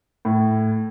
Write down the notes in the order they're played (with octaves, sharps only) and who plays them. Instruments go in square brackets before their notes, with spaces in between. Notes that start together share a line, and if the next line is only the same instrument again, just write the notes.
[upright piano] A2